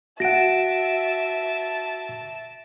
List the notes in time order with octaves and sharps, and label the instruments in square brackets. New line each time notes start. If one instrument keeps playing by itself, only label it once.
[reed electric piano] F#4 F#5 [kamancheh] E5 A5 [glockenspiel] A#6 D7